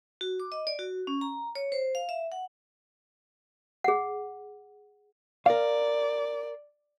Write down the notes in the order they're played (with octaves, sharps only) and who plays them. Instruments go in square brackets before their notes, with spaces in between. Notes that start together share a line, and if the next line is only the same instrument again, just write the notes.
[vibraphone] F#4
D6
D#5
D5
F#4
C#4
A#5
C#5
C5
F5
E5
F#5
[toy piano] G#4 F#5
[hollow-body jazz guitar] A#4 F5 [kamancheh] D5